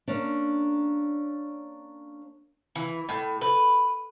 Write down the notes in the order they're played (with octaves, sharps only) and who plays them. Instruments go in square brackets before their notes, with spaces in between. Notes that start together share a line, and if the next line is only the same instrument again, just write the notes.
[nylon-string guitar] A#3 C#4 D4
[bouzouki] E3
A2
B4